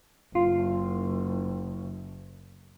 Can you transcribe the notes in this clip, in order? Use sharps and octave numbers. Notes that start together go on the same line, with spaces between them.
F#1 F4